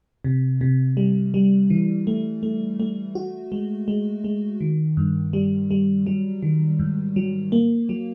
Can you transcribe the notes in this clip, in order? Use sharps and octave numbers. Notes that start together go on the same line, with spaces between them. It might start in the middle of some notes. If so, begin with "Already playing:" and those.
C3
C3
G3
G3
E3
A3
A3
A3
F#4
G#3
G#3
G#3
D#3
G2
G3
G3
F#3
D#3
G#2
F#3
A#3
F#3